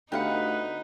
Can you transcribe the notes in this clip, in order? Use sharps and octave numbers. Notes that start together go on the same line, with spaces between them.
D2 A3 B3 D#4 G4 B4 F5 F#5